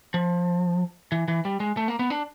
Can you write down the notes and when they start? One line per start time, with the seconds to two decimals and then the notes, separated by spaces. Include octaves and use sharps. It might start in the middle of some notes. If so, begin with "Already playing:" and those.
0.14 F3
1.12 E3
1.28 E3
1.45 G3
1.60 G#3
1.77 A3
1.88 A#3
1.99 B3
2.10 D4